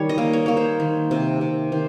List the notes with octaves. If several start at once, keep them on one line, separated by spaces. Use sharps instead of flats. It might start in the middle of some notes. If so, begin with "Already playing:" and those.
Already playing: D#3 G3 C#5
D#5
A#3
C#5
A#3 C#5
C5
D#3
C3
C3
D#3 C5